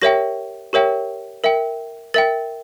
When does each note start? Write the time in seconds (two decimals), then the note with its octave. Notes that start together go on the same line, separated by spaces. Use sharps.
0.02 G4 A#4 C#5 E5 G5 A#6
0.73 G4 A#4 C#5 E5 G5
1.44 A#4 E5 G5
2.14 A#4 E5 G5 A6